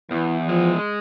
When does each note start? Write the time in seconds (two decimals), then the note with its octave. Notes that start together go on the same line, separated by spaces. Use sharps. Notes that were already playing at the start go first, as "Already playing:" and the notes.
0.11 E2 E3
0.48 F3 G#3